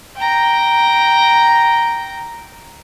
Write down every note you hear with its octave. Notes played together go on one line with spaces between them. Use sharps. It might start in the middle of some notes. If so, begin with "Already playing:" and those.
G5 A#5